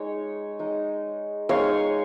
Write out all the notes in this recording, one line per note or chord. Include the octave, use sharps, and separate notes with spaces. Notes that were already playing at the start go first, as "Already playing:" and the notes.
Already playing: G#3 D#4 C#5
G#3 D#4
G#3 D#4 C#5 F5